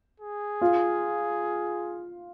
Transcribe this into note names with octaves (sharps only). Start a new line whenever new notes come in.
G#4
F4